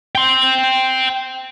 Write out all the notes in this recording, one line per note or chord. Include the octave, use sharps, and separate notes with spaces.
G5 C6